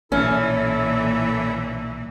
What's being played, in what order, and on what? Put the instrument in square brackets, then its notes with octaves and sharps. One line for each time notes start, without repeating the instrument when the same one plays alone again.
[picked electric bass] B1 [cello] A#2 E3 [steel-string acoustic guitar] C#4 [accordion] E4 A4